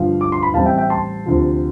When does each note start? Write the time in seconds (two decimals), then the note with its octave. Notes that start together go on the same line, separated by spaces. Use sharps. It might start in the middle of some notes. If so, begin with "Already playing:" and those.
Already playing: G1 G2 F3 F5
0.21 D6
0.32 C6
0.43 B5
0.54 A1 A2 G3 C4 F5 A5
0.66 E5 G5
0.77 E5 G5
0.90 A5 C6
1.26 D2 C3 F3